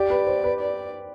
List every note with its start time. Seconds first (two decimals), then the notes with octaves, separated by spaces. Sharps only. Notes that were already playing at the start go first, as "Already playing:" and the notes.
Already playing: G4 D5
0.10 B4
0.27 C5
0.44 B4
0.60 D5